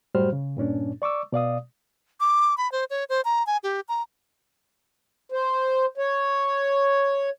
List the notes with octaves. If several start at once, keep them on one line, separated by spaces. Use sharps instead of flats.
F#2 A2 G3 F#4 C5 F6
C#3
G2 A#2 C#4 D4
D5 C#6 D6 E6
B2 D5 F5 D#6
D6
B5
C5
C#5
C5
A#5
G#5
G4
A#5
C5
C#5